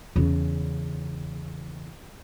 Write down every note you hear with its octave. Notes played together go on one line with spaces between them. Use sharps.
E2 C#3